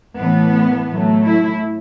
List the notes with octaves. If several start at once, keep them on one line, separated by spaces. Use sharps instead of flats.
A2 E3 A3 B3
A2 F#3 A3
E4